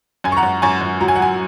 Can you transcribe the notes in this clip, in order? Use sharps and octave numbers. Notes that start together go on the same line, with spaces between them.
F#2 G#5
C#6
F#5 A#5
F#2
F#2 G#5 C#6
F#2
F#3 A#5
G#5
F#5
F#3 G#5